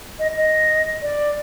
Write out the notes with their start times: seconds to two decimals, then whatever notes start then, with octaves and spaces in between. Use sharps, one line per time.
0.19 D#5
0.36 D#5
1.02 D5